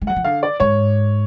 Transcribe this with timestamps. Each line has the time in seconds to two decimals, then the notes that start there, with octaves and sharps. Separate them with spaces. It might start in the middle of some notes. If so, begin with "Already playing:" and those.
0.01 G#3
0.07 F#3 F#5
0.16 F3
0.25 D3 F5
0.43 D5
0.60 G#2 C#5